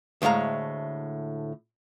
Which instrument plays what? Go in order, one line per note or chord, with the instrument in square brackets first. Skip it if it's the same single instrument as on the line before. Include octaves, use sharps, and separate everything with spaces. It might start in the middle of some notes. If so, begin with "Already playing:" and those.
[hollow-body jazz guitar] D2 A2 G#3 F5 A#5